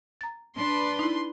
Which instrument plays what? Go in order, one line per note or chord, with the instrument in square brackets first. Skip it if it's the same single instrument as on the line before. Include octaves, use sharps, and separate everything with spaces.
[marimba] A#5 A6
[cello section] D4 B4 [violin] C6
[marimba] D#4 E4